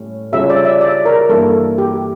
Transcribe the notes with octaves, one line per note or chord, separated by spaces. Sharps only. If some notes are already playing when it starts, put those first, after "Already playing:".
Already playing: A2 G3 C#4
C#3 G3 C#4 F4 E5
D5
E5
D5
A#4
G2 E3 A#3 E4 A4
G4